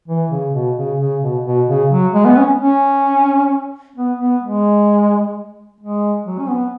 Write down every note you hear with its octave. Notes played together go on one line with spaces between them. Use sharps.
E3
C#3
B2
C#3
C#3
B2
B2
C#3
F#3
G#3
B3
C#4
C#4
B3
B3
G#3
G#3
F#3
C#4
B3